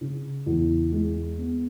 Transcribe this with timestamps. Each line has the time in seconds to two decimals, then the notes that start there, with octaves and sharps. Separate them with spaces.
0.01 C#3
0.46 E2
0.92 G#3
1.38 B3